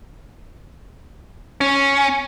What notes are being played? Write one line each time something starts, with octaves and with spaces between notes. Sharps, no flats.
C#4